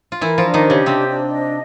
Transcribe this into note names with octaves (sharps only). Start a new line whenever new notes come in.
F4
E3 E4 A#4
F3 F4
D4
D#3 D#4
G4
C#3 C#4
C3 C4 D4
D4
D#5